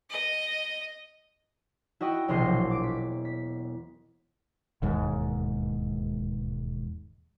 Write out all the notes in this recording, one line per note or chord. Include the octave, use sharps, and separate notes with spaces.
D#5
E4 F#4 D#5 G5 D#6
E1 A#1 C3 D#5 C6 C7
F#3
D6 D7
B6
B6
E1 D#2 G#2